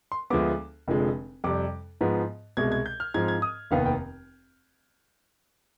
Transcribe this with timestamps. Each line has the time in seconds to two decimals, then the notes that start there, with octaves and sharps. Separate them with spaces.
0.12 C6
0.30 D2 D3 F3 G#3 B3 D6
0.88 F1 F2 D3 F3 G#3
1.44 F2 C3 G3 D6
2.01 G#2 F3 B3
2.57 C2 B2 G#3 G#6
2.72 G#6
2.86 G6
3.00 F6
3.14 G#2 F3 C4 G#6
3.28 G#6
3.42 D#6
3.71 F1 D#2 D#3 B3 F5
3.86 G5